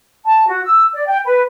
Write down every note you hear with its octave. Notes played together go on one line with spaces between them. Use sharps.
A5
F#4
E6
D5
G5
B4